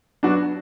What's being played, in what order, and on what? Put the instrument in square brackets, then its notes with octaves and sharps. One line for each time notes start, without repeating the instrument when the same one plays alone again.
[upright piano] F#3 B3 D4 F#4